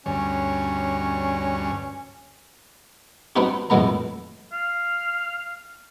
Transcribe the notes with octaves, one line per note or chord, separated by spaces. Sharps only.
D2 G2 C#4 C#5
B3 C4 D4 D#4 F#4 G4
F2 A2 D#3 G#3 B3 A#5
F5